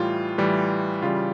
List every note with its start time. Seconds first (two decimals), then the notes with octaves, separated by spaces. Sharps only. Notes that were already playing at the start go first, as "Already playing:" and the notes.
Already playing: A2 E3 G3 F4
0.38 A2 E3 G3
1.02 C#3 E3 G3 F4